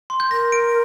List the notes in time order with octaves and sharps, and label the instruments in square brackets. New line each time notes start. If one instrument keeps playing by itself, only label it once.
[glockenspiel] C6
G6
[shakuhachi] A#4 [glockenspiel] A#6
[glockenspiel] D7